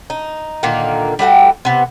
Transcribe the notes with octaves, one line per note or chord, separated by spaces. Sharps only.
D#4
A#2 D3 D#3 A#3
G3 A3 F#4 G5
C3 B3